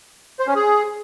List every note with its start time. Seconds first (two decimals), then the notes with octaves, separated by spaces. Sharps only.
0.40 C5
0.47 C#4
0.55 G#4